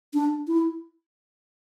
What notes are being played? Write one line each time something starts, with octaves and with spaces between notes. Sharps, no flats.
D4
E4